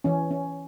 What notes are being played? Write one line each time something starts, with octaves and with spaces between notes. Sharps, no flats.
E3 C#4
C#4